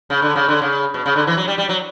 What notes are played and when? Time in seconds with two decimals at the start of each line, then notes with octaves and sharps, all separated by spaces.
0.10 C#3
0.22 D3
0.36 C#3
0.49 D3
0.62 C#3
0.94 B2
1.06 C#3
1.16 D3
1.27 E3
1.37 F#3
1.48 G3
1.58 G3
1.69 F#3